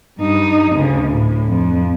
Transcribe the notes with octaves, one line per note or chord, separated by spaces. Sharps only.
G2 D#4
D2 C#3
A2
F2